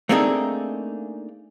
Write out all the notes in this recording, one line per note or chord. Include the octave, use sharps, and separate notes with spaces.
A3 A#3 C4 D4 D#4 G#4